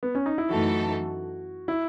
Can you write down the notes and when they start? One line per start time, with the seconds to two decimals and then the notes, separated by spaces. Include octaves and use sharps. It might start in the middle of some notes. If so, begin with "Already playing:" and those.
0.03 B3
0.15 C#4
0.26 D#4
0.38 E4
0.50 F#2 E3 A3 D#4 F#4 A4
1.68 E4